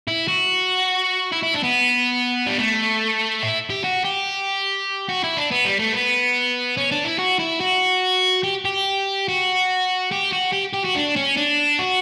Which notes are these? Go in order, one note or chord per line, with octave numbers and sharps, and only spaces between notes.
E4
F#4
E4
E4
D4
B3
G3
A3
E4
G4
F#4
G4
F#4
E4
D4
B3
G3
A3
B3
C#4
D4
E4
F#4
E4
F#4
G4
G4
F#4
G4
F#4
G4
G4
F#4
D4
C#4
D4
F#4